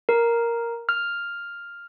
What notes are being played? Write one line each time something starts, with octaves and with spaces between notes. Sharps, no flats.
A#4
F6